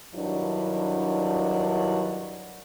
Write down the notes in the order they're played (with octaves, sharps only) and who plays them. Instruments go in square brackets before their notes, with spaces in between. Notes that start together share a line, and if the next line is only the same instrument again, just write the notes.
[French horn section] G2 D#3 F#3 D4 E4